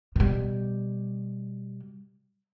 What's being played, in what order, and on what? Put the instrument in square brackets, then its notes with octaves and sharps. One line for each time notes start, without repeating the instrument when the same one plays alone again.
[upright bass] B2 G3